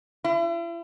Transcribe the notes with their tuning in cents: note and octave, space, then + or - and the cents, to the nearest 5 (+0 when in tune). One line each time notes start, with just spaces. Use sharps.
E4 +40